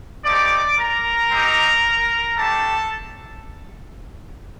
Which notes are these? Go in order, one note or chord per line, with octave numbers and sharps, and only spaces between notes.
A3 C4 D#4 G4 D5 D6
A#4 A#5
C4 D#4 G4
A3 D4 G4 A4 A5